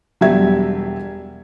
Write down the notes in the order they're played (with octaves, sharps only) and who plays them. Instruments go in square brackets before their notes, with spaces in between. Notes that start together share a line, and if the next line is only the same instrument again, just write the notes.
[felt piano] E1 F#3 G3 G4 E5 G#6